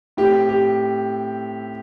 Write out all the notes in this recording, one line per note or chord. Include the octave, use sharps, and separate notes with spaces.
A2 A3 C4 G4
G4